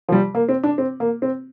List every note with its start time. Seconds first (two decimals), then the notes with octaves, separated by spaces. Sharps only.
0.09 F3
0.12 G3
0.35 A#3
0.49 C4
0.64 D4
0.78 C4
1.00 A#3
1.22 C4